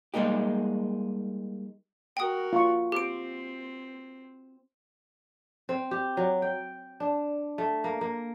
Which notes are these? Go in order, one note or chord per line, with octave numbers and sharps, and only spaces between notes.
G3 G#3 A#3 D#4 G4
F#4 A#4 G5 D#6
F4 C#6
C4 G4 D7
C4
G4
F#3
G5
D4
A3
A#3
A#3